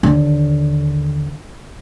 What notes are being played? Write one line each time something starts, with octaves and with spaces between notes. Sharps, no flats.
D#2 D3